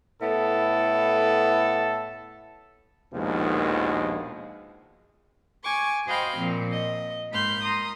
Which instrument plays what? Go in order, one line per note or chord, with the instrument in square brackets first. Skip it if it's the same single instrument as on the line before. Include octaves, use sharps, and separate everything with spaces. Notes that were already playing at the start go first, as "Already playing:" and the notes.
[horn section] A2 B3 E4 A4
[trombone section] A#1 D#2 B2 D#3 F3 G#3
[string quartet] G#5 C#6 D6
F#4 C5 D#5 F5 G5 B5
A#2 F3 C4
D#5
G#2 A#3 B5 C6 F6 G6
A#5 C6 D#6